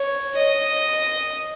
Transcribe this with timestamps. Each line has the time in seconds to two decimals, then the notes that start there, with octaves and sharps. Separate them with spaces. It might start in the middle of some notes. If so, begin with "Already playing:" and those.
Already playing: C#5
0.36 D#5